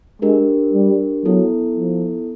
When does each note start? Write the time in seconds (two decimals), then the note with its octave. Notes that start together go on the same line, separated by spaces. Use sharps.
0.22 G#3 D4 G4 A#4
0.74 G3
1.24 F#3 B3 E4 A4
1.76 F3